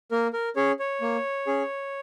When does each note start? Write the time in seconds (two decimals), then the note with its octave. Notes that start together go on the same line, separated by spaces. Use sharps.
0.11 A#3 A#4
0.33 A#4
0.56 C#4 G#4 C#5
0.79 C#5
1.01 A#3
1.47 C#4 G#4